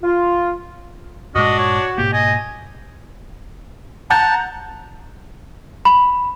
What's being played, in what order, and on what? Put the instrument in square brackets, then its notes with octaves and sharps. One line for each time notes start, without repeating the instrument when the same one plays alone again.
[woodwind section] F4
[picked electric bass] G2 A#2 G#3 [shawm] D4 [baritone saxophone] F#4 [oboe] D#5
[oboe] C#5
[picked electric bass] G#2 B2 A#3 [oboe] G4
[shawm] D#5 [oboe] G#5
[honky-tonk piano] F#5 A#5 G6 [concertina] A5
[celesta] B5